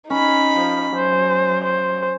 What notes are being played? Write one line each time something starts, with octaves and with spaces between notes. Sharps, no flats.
C#4 D#4 B5
F3
F#3 C5
C5